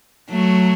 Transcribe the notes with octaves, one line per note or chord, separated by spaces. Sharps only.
F#3 A3